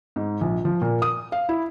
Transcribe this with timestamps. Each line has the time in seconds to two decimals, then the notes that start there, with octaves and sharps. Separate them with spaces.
0.16 G#2
0.41 A#1
0.65 F3
0.82 A#2
1.02 D#6
1.32 F5
1.49 E4